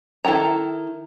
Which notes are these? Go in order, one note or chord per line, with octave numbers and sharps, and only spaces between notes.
D#3 E4 A4 G5 A#5